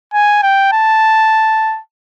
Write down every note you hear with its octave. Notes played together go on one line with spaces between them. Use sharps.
G#5
G5
A5